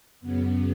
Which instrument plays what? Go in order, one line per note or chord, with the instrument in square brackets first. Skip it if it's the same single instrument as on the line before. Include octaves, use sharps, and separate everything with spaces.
[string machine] F#2 C#3 B3